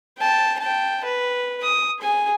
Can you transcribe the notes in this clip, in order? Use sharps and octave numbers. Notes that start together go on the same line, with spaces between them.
G5 A5
G5 A5
B4
D#6
G#4 G#5